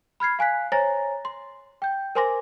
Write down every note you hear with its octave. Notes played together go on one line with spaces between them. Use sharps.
B5 F6 G#6 C7
F5 G#5 F#6 B6
C5 C#5 G#5 A#5 A6 A#6
C6
G5 G6
A#4 C5 G#5 C6 D6 A#6